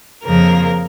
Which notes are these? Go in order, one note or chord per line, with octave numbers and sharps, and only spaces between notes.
F2 C#3 F3 A#3 A#4